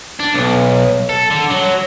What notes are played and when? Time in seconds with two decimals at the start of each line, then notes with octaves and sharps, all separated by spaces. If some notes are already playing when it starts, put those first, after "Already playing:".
0.20 D4
0.34 B1
1.09 A4
1.31 D3
1.51 F#3